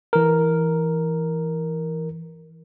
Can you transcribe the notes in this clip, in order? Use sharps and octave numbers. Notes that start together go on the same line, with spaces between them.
E3 A#4